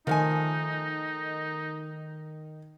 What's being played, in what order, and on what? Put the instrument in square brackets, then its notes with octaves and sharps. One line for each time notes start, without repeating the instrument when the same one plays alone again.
[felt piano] D#3 [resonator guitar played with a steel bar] F3 A3 G#5 [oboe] D#4